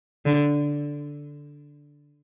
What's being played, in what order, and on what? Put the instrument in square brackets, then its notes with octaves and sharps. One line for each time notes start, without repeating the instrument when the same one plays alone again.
[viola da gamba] D3